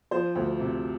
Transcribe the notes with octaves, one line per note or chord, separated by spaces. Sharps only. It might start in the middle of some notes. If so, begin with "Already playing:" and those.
F3 C5
D2
C3